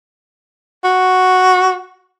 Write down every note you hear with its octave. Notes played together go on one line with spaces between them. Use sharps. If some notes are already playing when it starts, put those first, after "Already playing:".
F#4